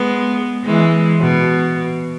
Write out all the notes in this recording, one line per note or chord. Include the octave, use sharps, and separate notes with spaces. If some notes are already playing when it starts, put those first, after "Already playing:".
Already playing: G#3 B3
E3 G#3
B2